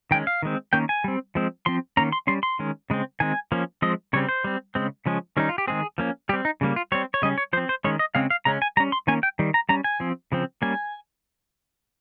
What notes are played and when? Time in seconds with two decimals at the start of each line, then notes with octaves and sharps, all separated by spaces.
0.11 D#3 G#3 C#4 G5
0.27 F5
0.42 D#3 G#3 C4
0.73 D#3 A#3 C#4 G5
0.89 G#5
1.04 G3 C4
1.35 F3 G#3 C4
1.66 F3 C4 C6
1.97 D#3 A#3 C#4 A#5
2.12 C6
2.27 G3 C#4 C6
2.43 C6
2.59 D#3 G#3 C#4
2.90 C#3 G#3 C4
3.20 D#3 G#3 C4 G#5
3.52 F3 A#3 C#4
3.82 F3 G#3 C4 D#5
4.13 C#3 G3 C4 C#5
4.29 C5
4.44 G3 C4
4.75 C#3 G#3 C4
5.06 C#3 F3 G#3 C#4
5.37 D#3 G3 C#4 D#4
5.49 F4
5.58 G4
5.68 D#3 G#3 C4 G#4
5.98 F3 A#3 C#4
6.29 G3 G4
6.33 C4
6.45 D#4
6.61 C#3 G3 A#3
6.76 F4
6.92 G3 C4 C#5
7.14 C#5
7.22 C#3 G3 C#4 D#5
7.38 C#5
7.53 F3 C5
7.57 C4
7.69 C5
7.84 D#3 G#3 C#4 C#5
7.99 D#5
8.15 C#3 G#3 C4 F5
8.30 F5
8.45 C#3 G#3 C#4 A#5
8.62 G#5
8.77 G3 A#5
8.80 C#4
8.92 C6
9.07 D#3 A#3 C#4 G#5
9.23 G5
9.39 D#3 G3
9.54 A#5
9.69 G3 C#4 A#5
9.84 G#5
10.00 F3 C4
10.32 C#3 F3 C4
10.62 G3 A#3 C#4 G#5